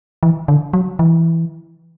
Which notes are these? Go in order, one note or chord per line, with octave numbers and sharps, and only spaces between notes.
E3
D3
F#3
E3